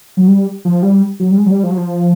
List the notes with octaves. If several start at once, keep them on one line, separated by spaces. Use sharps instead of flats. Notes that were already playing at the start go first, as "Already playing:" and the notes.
F#3
G3
F3
G3
F#3
G3
G#3
F#3
G3
F3
F#3
F3